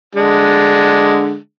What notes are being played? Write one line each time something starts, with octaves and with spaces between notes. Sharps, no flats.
D3 G#3 D4